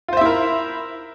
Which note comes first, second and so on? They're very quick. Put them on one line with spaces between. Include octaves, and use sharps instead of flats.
F4 C5 E5 E4 A#4